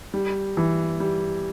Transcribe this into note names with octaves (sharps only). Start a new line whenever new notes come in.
G3
E3
G3